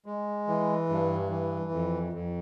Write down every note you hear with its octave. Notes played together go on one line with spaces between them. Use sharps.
G#3
E3
G2
E3
F2
F2